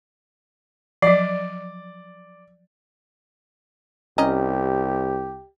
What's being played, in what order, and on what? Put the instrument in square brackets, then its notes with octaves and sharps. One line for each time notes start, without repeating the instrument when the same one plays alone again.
[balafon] F3 F#3 [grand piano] D5
[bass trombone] C2 [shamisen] C#4 D#5 A#5 [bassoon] G4